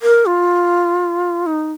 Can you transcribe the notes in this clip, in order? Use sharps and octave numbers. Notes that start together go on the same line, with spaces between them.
A#4
F4
D#4